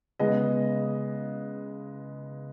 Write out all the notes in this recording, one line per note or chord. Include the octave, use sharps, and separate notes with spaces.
C#3 G#3 B3 D#5